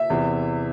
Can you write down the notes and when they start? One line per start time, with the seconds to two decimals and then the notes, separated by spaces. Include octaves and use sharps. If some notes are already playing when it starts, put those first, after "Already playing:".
Already playing: E5
0.10 E2 C3 E3